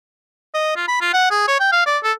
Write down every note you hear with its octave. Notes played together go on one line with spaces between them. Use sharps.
D#5
F4
B5
F4
F#5
G#4
C#5
G5
F5
D5
A4